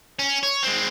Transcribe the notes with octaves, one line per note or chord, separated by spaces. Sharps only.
C#4
C#5
G#3 C4